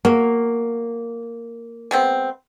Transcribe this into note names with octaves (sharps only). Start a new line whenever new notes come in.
F#3 A#3
G#3 B3 C4